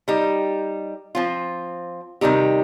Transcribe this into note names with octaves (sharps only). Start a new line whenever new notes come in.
G3 D#4 G4
F3 C4 F4
C3 D#3 G3 D#4 G4